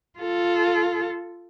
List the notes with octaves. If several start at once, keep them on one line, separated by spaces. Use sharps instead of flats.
F4 A4